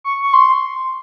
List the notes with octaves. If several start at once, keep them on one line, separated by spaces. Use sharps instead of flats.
C#6
C#6
C6